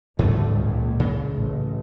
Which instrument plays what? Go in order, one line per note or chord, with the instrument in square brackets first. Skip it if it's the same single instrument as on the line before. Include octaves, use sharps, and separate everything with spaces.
[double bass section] A1 D2 D3 [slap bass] G#2 G3 A3
[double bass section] C#2 A#2
[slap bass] C#3
[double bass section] A1